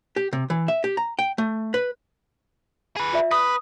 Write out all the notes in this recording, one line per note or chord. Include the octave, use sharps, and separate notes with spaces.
G4
C3
E3
E5
G4
A#5
G5
A3
B4
G#4 B4
F4 D5 E5
B4 D#6